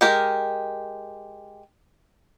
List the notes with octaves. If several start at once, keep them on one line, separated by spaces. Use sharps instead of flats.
G#3 G4 A#4